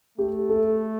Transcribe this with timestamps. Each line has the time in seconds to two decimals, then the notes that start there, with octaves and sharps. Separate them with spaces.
0.18 A3 G4
0.49 A4